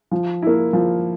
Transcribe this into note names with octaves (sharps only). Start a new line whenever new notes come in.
F3
A#3 E4
F3